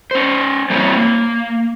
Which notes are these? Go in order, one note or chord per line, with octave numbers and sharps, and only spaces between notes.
C#4 C5
G3 A#3 C4 D4 E4 C#5
A#3